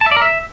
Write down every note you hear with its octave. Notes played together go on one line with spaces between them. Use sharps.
A5
E5
D5
A#4
E5